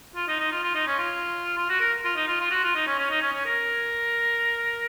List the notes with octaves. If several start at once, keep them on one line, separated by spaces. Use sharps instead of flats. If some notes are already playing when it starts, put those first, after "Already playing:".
F4
D#4
D#4
F4
F4
D#4
C#4
F4
F4
F#4
A#4
F4
D#4
F4
F4
F#4
F4
D#4
C#4
C#4
D#4
C#4
C#4
A#4